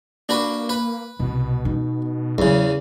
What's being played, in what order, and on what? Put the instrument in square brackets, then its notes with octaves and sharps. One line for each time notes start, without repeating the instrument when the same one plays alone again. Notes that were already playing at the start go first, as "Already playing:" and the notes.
[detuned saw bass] A#3 [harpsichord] D4 F#4 B4
[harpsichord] B4
[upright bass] C2 [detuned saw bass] B2
[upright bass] D#4
[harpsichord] E2 C#3 [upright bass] F#3